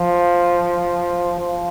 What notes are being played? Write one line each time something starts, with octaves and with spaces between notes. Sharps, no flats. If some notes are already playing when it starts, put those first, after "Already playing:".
Already playing: F3
F3